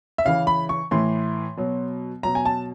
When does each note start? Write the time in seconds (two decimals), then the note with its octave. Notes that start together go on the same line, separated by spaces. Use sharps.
0.18 E5
0.25 C#3 E3 F5
0.47 B5
0.69 C#6
0.91 A2 E3 C6
1.57 B2 F#3
2.23 B2 F#3 A#5
2.35 G#5
2.45 A5